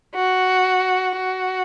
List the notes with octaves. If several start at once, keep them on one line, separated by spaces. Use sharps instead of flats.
F#4
F#4